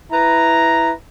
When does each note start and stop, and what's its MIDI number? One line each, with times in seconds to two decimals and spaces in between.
0.11 0.91 64
0.11 0.91 71
0.11 0.91 82